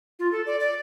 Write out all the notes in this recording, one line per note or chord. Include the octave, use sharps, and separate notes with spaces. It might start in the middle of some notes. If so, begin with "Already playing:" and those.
F4
A4
D5
D5